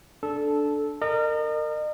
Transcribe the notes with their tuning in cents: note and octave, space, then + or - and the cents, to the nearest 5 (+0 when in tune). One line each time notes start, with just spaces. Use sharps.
D4 +0 A4 -10
A#4 -20 D#5 -40